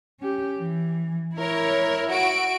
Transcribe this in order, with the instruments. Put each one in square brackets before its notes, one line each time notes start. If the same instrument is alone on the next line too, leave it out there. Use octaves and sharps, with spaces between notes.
[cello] C#4 G4
E3
[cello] E4 [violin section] A#4 C#5
[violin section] F#4 D7